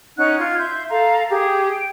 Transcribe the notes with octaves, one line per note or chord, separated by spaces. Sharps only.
C#4 D#4 F#5 F#6
F4 F6 G#6
E5 C6 G6
A4 F5 A#5
G4 G#4
G5